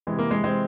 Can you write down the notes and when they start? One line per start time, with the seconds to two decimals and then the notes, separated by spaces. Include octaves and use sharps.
0.07 C3 E3 G#3
0.18 A#3
0.31 G#3
0.44 G#3 C4